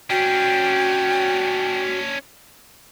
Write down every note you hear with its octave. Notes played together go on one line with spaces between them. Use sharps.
C#4 D4 F#4 G5